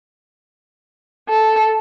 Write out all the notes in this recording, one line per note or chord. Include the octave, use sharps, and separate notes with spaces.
A4